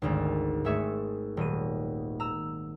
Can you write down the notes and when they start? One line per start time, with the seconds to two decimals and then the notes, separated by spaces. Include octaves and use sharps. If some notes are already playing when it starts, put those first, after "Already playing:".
0.02 G#1 D2 G#2
0.64 G#1 A3 G#4 E5 C#6
1.37 D#1 F#3 D#7
2.20 A#5 E6